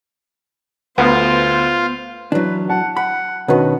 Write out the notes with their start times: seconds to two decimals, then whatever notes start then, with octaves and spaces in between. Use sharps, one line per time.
0.98 D2 B3 F4 C5
2.32 E3 F#3 D4 B4
2.70 F#5 A5
2.97 F#5 B5
3.48 B2 D#3 C#4 D4 F#4 B4